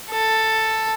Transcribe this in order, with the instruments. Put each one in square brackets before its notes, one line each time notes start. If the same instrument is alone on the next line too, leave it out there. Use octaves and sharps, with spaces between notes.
[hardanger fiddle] A4